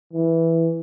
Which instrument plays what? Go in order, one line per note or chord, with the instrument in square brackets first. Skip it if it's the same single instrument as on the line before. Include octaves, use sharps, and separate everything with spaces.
[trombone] E3